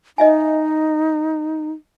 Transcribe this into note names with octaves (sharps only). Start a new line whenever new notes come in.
D#4 D#5 E5 G#5